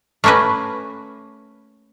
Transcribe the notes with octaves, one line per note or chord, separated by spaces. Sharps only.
A3 A#3 C#4 A#4 B4